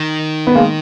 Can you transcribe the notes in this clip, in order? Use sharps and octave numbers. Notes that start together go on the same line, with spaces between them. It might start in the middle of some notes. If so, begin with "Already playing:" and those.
Already playing: D#3
B3
G#3 A#3